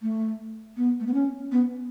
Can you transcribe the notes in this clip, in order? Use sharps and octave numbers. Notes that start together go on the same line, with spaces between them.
A3
B3
A3
B3
C#4
B3